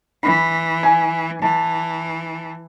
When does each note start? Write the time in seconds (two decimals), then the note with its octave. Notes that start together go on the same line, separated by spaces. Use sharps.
0.23 E3 B5
0.83 G#5
1.42 E3 A5